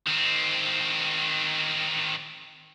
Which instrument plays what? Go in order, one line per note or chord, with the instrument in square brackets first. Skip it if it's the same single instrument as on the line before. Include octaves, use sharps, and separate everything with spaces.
[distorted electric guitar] D#3 C4